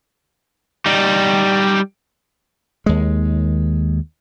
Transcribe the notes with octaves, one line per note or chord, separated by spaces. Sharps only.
G3 D#4
D#2 G#3